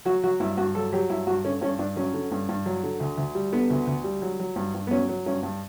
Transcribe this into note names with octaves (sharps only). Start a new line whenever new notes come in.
F#3 F#4
F#3 F#4
G2 E4
G2 F#4
F#3 A4
F#3 G4
G2 E4
G2 F#4
D3 C#4
G2 C#4
G2 D4
F#3 C#4
D3
G2
G2
F#3
D3
D2
D2
G3
D3 B3
D2
D2
G3
F#3
F#3
G2
G2
B3
F#3 C#4
F#3
G2 C#4
G2